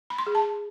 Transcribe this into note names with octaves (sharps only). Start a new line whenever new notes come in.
B5
C6
G#4
A5